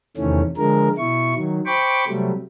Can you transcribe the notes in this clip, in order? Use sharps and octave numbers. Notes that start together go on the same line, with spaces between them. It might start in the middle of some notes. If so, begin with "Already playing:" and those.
E2 C3 D#3 E3 A3 C#4
D3 F3 G#3 A#4
B2 E4 C#6
D#3 F#3
C5 G5 B5 C#6 D6
C3 F#3 G3 A3